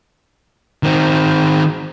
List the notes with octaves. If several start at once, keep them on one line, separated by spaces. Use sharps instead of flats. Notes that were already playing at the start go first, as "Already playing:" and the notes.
D#3 C4